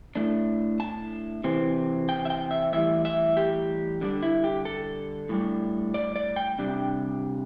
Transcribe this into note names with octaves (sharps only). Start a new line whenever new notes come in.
A2 A3 D4
A5
C3 E3 C4
G5
E5
G5
E5
A2 E3 G3 E5
E5
G4
D3 G3 D4
E4
G4
A4
A2 G3 D4
D5
D5
G5
C3 G3 D4